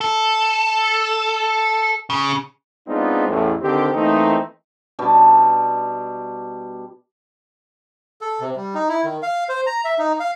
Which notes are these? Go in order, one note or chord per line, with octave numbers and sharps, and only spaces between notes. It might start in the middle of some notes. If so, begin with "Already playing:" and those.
A4
C#3
G#3 B3 C4 D4 D#4 F4
A1 E2 A2
D3 D#3 C4 G4
E3 A3 A#3 C4 D#4
B2 G3 D4 A5
A4
C3
G3
D#4
E4
D#3
F5
C5
A#5
E5
D#4
F5